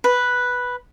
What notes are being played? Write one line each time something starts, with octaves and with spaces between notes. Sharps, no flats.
B4